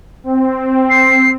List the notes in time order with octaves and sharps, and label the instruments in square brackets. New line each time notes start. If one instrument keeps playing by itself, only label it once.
[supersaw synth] C4
[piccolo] C7